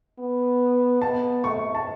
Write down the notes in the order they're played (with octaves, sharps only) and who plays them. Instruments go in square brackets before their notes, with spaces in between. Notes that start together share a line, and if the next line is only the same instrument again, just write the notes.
[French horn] B3
[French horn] B3 [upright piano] A5
[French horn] A3 [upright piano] C#6
[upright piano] A5